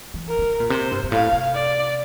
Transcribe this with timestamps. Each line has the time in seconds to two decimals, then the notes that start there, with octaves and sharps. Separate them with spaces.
0.14 E3
0.29 A#4
0.39 E3
0.42 D3
0.60 A#2
0.70 C3 C5
0.91 G2
1.04 G2
1.12 A2 F5
1.33 C3
1.55 D5